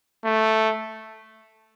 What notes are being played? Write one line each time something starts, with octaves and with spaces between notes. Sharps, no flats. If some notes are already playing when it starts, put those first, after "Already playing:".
A3